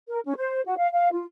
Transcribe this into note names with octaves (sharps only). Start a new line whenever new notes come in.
A#4
C#4
C5
F#4
F5
F5
F4